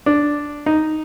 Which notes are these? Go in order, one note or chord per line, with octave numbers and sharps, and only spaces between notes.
D4
D#4